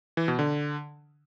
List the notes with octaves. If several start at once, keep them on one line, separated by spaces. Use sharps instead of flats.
E3
B2
D3